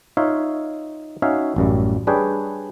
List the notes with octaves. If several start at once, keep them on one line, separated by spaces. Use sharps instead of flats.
D#4 F4 C#5 E5 F5
C#4 D#4 F#4 C#5 E5 F5
A1 F#2 G3
G3 D4 G#4 B4 C#5 G5